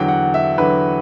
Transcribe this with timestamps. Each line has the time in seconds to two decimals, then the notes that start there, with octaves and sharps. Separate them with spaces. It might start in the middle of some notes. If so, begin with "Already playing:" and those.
Already playing: E2 D3 F#3 G5
0.08 F#5
0.34 E5
0.58 E2 D3 F#3 B4